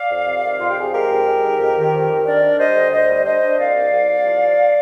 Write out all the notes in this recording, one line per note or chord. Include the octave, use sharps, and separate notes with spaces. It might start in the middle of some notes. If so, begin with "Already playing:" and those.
Already playing: D5 F5
F2
C3
D#3
F2 F4
G4
C3 G#4
G#3 G4 A#4
F2
G#3
D#3
F2
D#3
F2
D#3
D4 A#4 D5
D4
G3 C5 D#5
D3
D2 C5 D#5
G3
D4 C5 D#5
D4
C2 D5 F5
C2
C2
C2
F3
F3